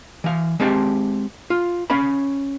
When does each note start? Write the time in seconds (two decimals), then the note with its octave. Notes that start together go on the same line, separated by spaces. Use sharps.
0.24 E3 F5
0.60 G#3 C4 G4 F5 A5
1.50 F4
1.90 C#4 F5 B5